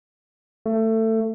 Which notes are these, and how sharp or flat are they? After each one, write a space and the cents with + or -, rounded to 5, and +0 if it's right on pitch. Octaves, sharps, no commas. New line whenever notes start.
A3 +20